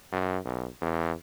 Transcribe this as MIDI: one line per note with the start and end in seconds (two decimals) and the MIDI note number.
0.12 0.38 42
0.45 0.68 35
0.81 1.12 40